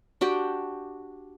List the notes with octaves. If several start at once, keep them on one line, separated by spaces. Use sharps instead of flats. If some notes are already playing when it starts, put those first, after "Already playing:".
D4 F#4 G4 G5